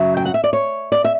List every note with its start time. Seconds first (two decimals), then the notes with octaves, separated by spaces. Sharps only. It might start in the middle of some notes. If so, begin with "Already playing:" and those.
Already playing: F#2 C#3 F#3 E5
0.17 G5
0.25 F#5
0.34 E5
0.44 D5
0.53 C#5
0.92 D5
1.04 E5